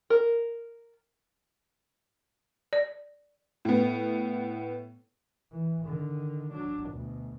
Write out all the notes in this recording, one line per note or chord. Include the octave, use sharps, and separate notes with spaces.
A#4
D5
A2 B3
E3
D3 D#3
F#3 D4
D2 B2